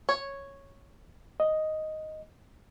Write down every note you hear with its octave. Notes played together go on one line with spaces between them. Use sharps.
C#5
D#5